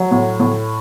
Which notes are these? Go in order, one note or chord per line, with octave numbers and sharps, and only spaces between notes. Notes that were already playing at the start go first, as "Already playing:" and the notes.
Already playing: F#3 F#4
A2
A2